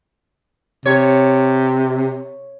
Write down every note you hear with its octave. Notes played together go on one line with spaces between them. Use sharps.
C3 C#5